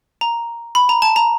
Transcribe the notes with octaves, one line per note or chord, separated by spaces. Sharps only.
A#5
B5
A#5
A5
A#5